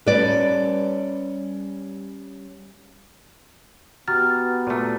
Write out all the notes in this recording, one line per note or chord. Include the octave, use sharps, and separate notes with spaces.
G3 C#4 B4 D5
B3 F#4 G4 A#5 F6 A6
A#2 A3 D5 D#7